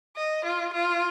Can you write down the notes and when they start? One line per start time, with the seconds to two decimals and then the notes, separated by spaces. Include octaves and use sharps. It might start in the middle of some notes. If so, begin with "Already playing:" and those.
0.16 D#5
0.45 F4
0.73 F4